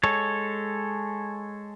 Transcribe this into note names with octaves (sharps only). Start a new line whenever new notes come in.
G#3 A4 C#5